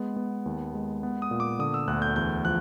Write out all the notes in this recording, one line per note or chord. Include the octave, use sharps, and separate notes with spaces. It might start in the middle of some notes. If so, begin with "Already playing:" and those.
Already playing: G#3 B3
B3
D#2
G#3
B3
D#6
A#2
D6
D3 D#6
E6
D2 F#6
G6
E2 G6
F3 F#6